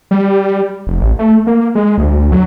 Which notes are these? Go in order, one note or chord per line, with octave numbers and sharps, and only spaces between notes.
G3
F1
A1
A3
A#3
G#3
D2
F#3